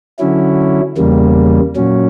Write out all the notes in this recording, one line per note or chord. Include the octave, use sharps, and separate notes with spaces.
D3 F#3 C#4 E4
E2 C#3 G3 A#3
A#2 F#3 C#4